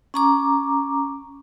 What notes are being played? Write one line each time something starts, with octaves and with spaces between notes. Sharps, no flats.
C#4 A#5 D6